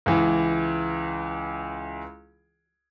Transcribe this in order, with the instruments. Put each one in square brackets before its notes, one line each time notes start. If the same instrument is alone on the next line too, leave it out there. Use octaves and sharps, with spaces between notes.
[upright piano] C#2 E3